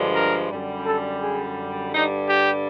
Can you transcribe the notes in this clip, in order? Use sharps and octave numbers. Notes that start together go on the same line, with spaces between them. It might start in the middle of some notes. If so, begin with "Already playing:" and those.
Already playing: G2 D3 F3 G#3
A#4
F#2 D3 G3
A4
G#4
G2 D3 G3 D#4
G4